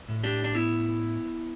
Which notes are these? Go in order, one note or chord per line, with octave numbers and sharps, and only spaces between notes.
A2
D4 G4
D4
B3 E4